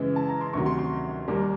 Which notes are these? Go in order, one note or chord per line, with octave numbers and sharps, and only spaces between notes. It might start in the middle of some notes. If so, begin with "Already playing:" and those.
Already playing: F#2 C#3 E3 G#3
A5
A#5
C6
D2 C3 D#3 F#3 C#6
C6
C6
D#2 D#3 G3 A#3